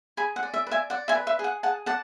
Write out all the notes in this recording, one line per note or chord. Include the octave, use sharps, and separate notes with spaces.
G#4 G#5 B5
F#5
D5
E5
B4
E5 G#5
D5 F#5
E5 G#5
B4
E5
G#4
F#5
G#4 F#5 A5
D5 F#5 A5